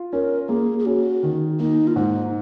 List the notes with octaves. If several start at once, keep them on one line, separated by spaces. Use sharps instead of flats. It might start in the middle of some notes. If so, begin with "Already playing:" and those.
Already playing: F4
C#4 A#4
A#3 G#4
G#4
C#4 F#4
D#3
A#3 D#4
F4
G#2 D#4